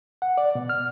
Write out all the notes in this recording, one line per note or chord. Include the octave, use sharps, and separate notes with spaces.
F#5
D5
B2
F6